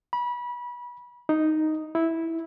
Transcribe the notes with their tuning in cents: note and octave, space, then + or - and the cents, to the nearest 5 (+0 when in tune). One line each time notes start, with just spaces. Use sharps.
B5 -25
D#4 +0
E4 -10